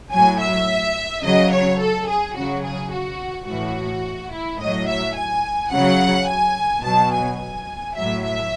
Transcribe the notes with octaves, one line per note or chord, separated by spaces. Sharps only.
A2 F#3 G#5
E5
C#3 F#3 D#5
C#5
A4
G#4
C#3 F#3 F#4
G#4
F#4
A2 E3 F#4
E4
A2 F#3 D#5
E5
G#5
C#3 F#3 F#5
G#5
B2 F#3 A5
G#5
G#5
A2 F#3 E5
E5